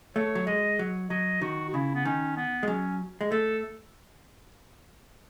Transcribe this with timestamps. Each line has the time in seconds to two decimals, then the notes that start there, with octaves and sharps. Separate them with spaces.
0.15 A3 C#5
0.35 F#3
0.47 G#3 D#5
0.79 F#3
1.10 F#3 D#5
1.41 D#3 F#4
1.69 F#4
1.73 C#3 E4
1.95 B3
2.05 D#3 C#4
2.37 B3
2.63 G#3
2.68 F#3 C#4
3.21 G#3
3.31 A3 A4